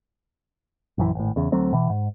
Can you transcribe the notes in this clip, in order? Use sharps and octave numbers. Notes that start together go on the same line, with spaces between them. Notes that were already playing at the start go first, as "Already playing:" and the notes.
A#1 F#2 E3
G#1 A2
E2 C#3
D2 F#3 A3 C4
B2 E3
G#2